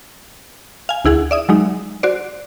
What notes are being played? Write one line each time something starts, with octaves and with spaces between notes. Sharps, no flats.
F5 G#5
D2 E4 G#4 F#5
D5 E5 D#6
F#3 G#3 D#4
F#4 C5 D5